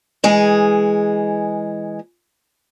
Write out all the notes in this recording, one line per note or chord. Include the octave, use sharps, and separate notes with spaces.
E3 G#3 G#4